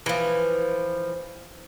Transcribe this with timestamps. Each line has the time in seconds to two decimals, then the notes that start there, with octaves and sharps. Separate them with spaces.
0.06 E3 F3